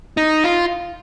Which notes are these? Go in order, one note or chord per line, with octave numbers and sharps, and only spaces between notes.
D#4
F4